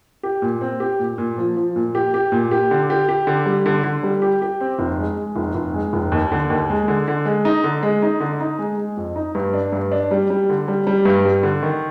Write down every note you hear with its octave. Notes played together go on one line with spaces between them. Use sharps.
G4
A#2
C4
G4
A#2
A#2
F3
F3
A#2
G4
G4
A#2
G4
D3
G4
G4
D3
G3
D3
D3
G3
G4
G4
C4
F1
G#3
G#3
F1
F1
G#3
F1
D#2
D3
D#2
G#3
D3
D3
G#3
D#4
D3
G#3
D#4
D3
D#4
G#3
G#3
F2
D#4
G2
D4
G2
D4
G3
G3
D3
G3
G3
G2
G3
D3
D#3